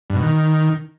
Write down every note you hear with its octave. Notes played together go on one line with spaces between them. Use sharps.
G2
B2
D#3